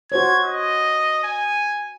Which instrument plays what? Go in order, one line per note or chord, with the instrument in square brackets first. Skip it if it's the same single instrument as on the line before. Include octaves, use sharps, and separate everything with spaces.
[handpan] F#4 C5 C#5 [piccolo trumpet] G#6
[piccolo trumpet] D#5
G#5